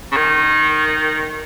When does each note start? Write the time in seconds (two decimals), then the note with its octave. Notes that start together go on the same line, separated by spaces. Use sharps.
0.12 C#3
0.16 D#3